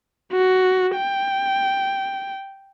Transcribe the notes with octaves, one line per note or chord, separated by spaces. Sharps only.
F#4
G5